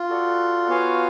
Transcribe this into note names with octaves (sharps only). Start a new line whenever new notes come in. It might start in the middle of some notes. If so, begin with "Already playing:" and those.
Already playing: F4
F#4 A4 D5 F#5
B3 F#4 C#5 F5 G#5